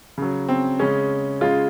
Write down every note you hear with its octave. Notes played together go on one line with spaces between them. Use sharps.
C#3 F#3
C4
C#3 G#3 C#4
C#3 G#3 F4